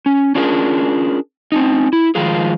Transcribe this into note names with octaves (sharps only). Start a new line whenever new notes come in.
C#4
C#4 D4 F4 G#4 A#4
C4 C#4 D#4
E4
D#3 F3 G#3 F4 G#4